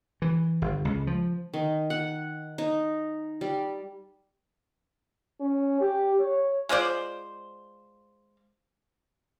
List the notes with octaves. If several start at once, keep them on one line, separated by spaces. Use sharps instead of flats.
E3
G1
C#2
F3
D#3
F#5
D#4
G3
C#4
G4
C#5
G#3 F4 C5 D5